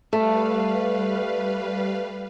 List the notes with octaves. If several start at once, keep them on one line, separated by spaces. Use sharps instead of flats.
G3 A3 B4 F5